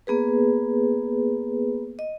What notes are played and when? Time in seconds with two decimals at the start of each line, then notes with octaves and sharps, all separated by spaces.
0.07 A#3 B3 G#4 B4
1.99 D#5